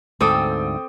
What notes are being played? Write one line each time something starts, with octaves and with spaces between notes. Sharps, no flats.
D2 G#2 C4 A4 G5 D6 D#6